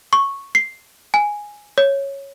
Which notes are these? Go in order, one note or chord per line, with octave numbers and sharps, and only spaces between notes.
C#6
C7
G#5
C#5